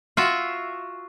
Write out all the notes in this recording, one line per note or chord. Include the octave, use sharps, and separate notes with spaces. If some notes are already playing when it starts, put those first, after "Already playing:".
F4 F#4 E5